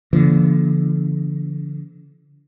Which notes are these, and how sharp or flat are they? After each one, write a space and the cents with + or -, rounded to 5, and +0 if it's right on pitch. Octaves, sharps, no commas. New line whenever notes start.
D3 -30 F3 -45 A#3 +20